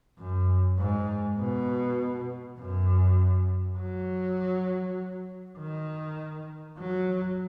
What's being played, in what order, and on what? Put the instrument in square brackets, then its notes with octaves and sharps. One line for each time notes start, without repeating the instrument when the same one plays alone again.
[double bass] F#2
G#2
B2
F#2
F#3
D#3
F#3